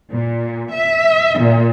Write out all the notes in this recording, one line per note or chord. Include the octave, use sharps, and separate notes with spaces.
A#2
E5
A#2